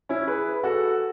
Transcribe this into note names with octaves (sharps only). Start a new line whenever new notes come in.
C#4 E4
G#4 B4
F#4 A4